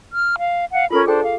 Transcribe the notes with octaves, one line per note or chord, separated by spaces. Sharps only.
F6
F5
F5 F#5
C#4 F4 A4 A#4 B5
D4 G#4 A4 C5 G5
F5